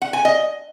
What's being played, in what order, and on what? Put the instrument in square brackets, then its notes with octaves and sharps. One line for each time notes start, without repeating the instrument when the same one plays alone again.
[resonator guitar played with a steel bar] F#5
G#5
D#5